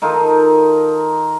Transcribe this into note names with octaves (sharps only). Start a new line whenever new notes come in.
D#3 D#4 F4 A4